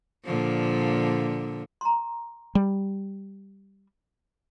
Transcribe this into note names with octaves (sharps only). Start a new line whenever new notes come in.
A#2 D3 F3
A#5 C6
G3